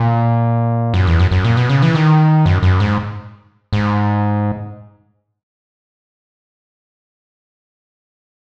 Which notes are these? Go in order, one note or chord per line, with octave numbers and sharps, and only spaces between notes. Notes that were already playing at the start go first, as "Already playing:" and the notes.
Already playing: A#2
F#2
E2
F#2
F#2
A#2
B2
C#3
E3
D#3
F#2
F#2
G#2
G#2